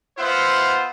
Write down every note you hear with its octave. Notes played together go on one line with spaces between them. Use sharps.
B3 F4 C5 E5 F#5